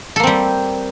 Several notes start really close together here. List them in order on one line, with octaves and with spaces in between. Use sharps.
A4 A#3 C4 G3